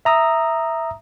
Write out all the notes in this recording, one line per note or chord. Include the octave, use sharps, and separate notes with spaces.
E5 A#5 D#6 E6